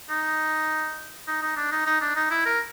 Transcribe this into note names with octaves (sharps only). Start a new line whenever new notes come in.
D#4
D#4
D#4
D4
D#4
D#4
D4
D#4
E4
A#4